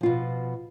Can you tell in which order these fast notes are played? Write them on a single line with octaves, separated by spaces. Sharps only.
F3 F4 B2